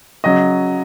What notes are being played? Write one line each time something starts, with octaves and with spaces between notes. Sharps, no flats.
C#3 F#3 D#5